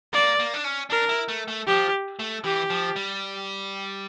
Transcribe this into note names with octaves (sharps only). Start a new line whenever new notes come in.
A#3 D5
A#3
D4
C#4
D4 A#4
E4
A3
A3
F3 G4
A3
E3 G4
F3
G3